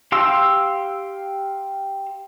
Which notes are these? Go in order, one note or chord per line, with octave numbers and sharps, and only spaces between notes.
G4 F5 C6 E6